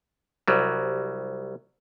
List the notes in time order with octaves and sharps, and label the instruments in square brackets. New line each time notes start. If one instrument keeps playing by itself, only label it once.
[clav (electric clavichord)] C2 F#3 G3